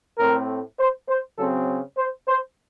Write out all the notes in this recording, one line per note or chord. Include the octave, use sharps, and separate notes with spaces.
A2 A3 C4 A#4
C5
C5
C#3 F#3 C4 A4
C5
C5